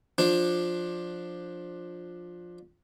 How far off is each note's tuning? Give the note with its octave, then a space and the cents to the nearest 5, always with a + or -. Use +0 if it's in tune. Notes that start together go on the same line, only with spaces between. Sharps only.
F3 +15 D4 +10